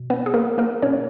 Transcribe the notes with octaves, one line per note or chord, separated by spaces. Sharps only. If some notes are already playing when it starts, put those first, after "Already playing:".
Already playing: B2
B3 B4
G#4
A#3 A#4
A#3 A#4
B2 C#4 C#5